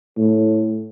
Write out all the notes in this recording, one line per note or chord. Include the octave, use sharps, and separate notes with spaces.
A2